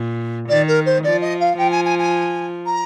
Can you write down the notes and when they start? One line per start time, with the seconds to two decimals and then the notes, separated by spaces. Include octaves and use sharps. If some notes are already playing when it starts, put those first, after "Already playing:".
Already playing: A#2
0.49 D#3 D5
0.67 A#4
0.86 C5
1.04 F3 D5
1.21 D#5
1.40 F5
1.58 F3 G5
1.71 G#5
1.85 G#5
1.99 G#5
2.66 A#5